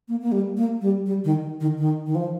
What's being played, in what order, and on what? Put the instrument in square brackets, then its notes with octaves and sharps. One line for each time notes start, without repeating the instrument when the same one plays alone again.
[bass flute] A#3
A#3
G3
A#3
G3
G3
D#3
D#3
D#3
D#3
F3